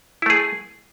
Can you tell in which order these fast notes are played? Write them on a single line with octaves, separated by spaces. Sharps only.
E4 A3 G#4